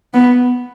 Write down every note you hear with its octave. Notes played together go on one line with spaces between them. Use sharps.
B3